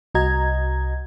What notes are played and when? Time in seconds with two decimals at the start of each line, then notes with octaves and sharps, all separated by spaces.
0.15 C2 F#4 D#5 A#5 G#6